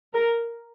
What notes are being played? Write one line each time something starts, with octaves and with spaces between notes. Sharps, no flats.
A#4